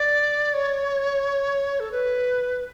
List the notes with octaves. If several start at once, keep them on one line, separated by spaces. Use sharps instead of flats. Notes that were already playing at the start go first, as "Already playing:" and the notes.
Already playing: D5
C#5
A4
B4